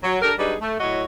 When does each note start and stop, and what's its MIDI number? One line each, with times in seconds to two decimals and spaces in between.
0.04 0.17 54
0.21 0.33 62
0.21 0.33 67
0.21 0.33 69
0.21 0.33 70
0.39 0.54 54
0.39 0.54 55
0.39 0.54 62
0.39 0.54 63
0.39 0.54 68
0.39 0.54 71
0.61 0.75 57
0.80 1.04 45
0.80 1.04 54
0.80 1.04 64
0.80 1.04 66
0.80 1.04 73
0.80 1.04 75